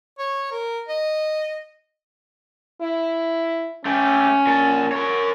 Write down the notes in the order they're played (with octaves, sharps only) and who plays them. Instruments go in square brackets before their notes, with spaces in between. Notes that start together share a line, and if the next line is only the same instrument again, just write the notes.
[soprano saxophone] C#5
A#4
D#5
[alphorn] E4
[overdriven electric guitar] A3 G4 [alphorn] C#4
[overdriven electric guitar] A#2 A5
A#4 C#5